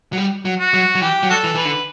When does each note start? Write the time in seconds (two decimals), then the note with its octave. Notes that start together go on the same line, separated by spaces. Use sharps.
0.13 F#3
0.17 G3
0.45 F#3
0.60 F#4
0.74 F#3
0.95 F#3
1.01 E3 G4
1.23 F#3
1.30 D4 F#4 A4
1.44 E3
1.55 E3 B4
1.65 D3